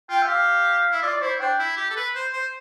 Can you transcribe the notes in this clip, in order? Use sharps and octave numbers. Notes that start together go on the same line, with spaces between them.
F4 G5
E5
G4 F5
E4 E5
F4 D5
D5
E4 C5
D4 G5
E4
G4
A4
B4
C5
C5